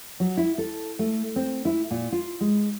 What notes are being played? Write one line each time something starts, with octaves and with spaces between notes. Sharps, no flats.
F#3
E4
A4
A3
C4
E4
A#2
F4
G#3